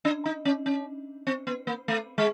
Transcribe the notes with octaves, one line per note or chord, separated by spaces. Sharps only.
D4
D#4
C#4
C#4
C4
B3
A#3
A3
G#3